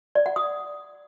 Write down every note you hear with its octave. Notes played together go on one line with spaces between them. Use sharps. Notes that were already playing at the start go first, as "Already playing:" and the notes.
D5
F#5
D#6